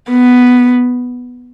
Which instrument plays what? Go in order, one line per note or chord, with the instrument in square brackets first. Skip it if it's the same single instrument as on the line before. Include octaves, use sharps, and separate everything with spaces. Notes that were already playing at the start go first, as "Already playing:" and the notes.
[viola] B3